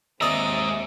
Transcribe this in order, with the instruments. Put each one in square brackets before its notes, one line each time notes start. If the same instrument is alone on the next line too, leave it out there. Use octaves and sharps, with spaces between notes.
[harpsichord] D#2 D5 [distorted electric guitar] G#3 A#5 [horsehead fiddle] C4 E5 [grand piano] D#6 E6